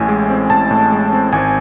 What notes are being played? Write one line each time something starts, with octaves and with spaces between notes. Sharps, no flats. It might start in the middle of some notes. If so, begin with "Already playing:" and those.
Already playing: A1 A2 G#5
G#3
C4
A1 A5
A2
G#3
C4
G#1 G#5